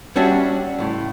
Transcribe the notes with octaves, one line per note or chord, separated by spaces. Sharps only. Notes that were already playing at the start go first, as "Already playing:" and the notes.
G3 C#4 D4 F#4 E5
C#2 A2